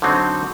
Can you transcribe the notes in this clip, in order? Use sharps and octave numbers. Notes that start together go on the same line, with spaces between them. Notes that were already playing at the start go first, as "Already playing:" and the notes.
D3 F#3 C4 D#4